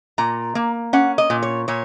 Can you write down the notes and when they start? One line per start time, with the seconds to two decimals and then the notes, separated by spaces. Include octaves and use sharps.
0.18 A#2 A#5
0.55 A#3
0.93 C#4 F#5
1.18 D#5
1.30 A#2
1.43 C#5
1.68 A#2 C#5